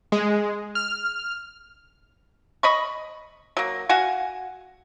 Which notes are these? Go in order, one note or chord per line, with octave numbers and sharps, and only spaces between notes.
G#3
F6
D#5 B5 C#6
F#3 A#3
F#4 F5 F#5 G#5